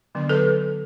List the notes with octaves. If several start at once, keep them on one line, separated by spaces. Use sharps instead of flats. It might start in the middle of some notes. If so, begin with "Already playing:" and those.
D3 F#3 B3 D4
A4 B4